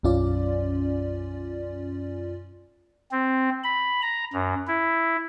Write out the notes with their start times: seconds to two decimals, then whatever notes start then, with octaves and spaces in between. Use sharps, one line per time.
0.03 B1 F#2 C#4 F4 D5
3.11 C4
3.64 B5
4.02 A#5
4.33 F#2
4.67 E4